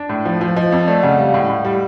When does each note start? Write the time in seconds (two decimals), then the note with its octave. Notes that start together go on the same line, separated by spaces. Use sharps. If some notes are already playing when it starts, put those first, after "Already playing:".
Already playing: D4
0.09 A2
0.25 F3
0.41 F3
0.56 F3 D#5
0.72 F2
0.87 A3 D5
1.03 C#3 F#5
1.19 G3 F5
1.34 A2
1.50 A2
1.65 G3